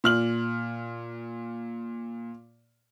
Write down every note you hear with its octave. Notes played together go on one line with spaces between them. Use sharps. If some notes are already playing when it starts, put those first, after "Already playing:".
A#2 F6 F#7